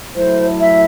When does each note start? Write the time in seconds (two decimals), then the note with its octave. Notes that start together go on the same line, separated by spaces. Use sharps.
0.15 F#3 A3 E4 C5
0.60 E5